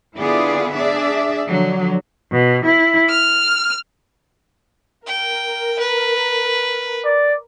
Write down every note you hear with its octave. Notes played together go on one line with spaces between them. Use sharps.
D3 B3 E4 F4 G#4 D5
D4 G#4 D5 E5
D3 F3 F#3
B2
E4
F6
A#4 G5
B4
D5